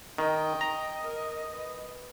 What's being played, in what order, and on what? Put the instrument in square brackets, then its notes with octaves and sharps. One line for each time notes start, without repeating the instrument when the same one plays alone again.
[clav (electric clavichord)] D#3 [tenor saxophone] D#5 [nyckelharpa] G5
[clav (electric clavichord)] A#5
[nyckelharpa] A#4
B4